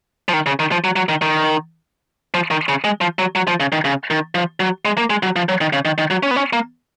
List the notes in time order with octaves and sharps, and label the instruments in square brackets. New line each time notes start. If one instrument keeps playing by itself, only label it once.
[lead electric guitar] F3
D#3
C#3
D#3
F3
F#3
F#3
D#3
D#3
F3
D#3
C#3
G#3
F3
F#3
F#3
F3
C#3
D#3
C#3
D#3
F3
F#3
G#3
A#3
G#3
F#3
F3
F#3
D#3
C#3
D#3
D#3
F#3
C#4
B3
C#4
A#3